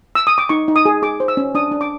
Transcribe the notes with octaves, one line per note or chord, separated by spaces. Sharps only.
E6
D#6
D6
D#4 C#6
D#4
D#6
G#4
G#4 D6
C5
E6
C#4
D4 D#6
D4
D6